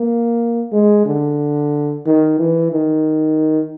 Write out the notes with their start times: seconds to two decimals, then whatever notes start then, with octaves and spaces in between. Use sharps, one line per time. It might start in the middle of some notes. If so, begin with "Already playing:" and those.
Already playing: A#3
0.72 G#3
1.05 D3
2.06 D#3
2.39 E3
2.72 D#3